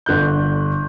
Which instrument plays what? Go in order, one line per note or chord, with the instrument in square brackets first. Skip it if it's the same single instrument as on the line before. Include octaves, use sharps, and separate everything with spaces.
[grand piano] G1 D3 F#6 G6